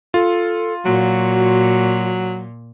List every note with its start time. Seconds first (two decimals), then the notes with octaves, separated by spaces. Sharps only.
0.14 F4 A4
0.85 A#2 F#3 F#4